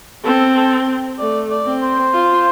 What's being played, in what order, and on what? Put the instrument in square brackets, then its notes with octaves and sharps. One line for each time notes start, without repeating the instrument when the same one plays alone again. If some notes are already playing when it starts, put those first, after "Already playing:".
[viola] C4 [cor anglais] A4
[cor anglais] A4
[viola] A3 [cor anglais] D5
[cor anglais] D5
[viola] C4
[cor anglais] C5
[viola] F4